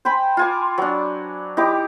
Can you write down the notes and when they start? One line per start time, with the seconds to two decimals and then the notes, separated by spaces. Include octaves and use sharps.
0.05 C5 G5 G#5 B5
0.37 F4 G#5 D6
0.78 F#3 D4
1.57 D#4 E4 G4 D6